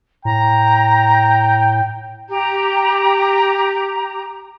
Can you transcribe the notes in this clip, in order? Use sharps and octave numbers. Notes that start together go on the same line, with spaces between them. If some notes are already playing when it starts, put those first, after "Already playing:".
A2 G5 A#5
G4 A#5